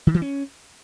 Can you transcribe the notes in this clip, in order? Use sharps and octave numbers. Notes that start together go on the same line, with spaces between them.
D#3
E3
C#4